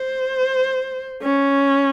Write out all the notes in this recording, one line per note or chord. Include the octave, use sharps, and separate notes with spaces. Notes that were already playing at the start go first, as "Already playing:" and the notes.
Already playing: C5
C#4